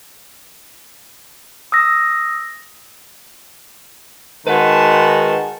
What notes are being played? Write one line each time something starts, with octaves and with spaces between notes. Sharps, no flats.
D#6 E6 A#6
D#3 G#3 F#4 B4 A5